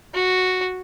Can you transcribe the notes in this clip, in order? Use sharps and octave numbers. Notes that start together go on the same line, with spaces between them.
F#4